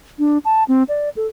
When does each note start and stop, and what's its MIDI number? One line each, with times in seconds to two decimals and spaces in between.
0.19 0.38 62
0.45 0.64 81
0.68 0.83 60
0.89 1.09 74
1.17 1.27 69